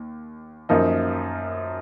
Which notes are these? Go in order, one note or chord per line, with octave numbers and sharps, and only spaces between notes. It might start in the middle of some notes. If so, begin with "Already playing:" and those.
Already playing: D#2
F#2 F3 A#3 D#4